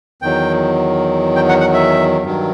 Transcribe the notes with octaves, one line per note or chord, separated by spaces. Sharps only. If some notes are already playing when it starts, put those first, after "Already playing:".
E2 D#3 F#3 G5
G5
F#5
F#5
E5
G2 D#3 F#3